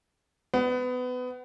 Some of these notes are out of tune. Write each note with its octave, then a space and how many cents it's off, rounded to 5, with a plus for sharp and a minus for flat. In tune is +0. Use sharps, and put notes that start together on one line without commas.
B3 +25